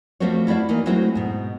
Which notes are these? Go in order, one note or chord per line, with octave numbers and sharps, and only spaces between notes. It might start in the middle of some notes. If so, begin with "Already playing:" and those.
F3 G3 A3 C4 F#4 C#5
A3 E4 F#4 D5 F5
E3 A#3 D#4
F#3 G#3 A3 C4 E4 F#4
G#2 B2